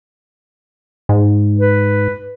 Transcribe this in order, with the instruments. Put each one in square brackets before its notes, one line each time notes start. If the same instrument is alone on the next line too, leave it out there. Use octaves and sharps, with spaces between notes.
[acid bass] G#2
[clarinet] B4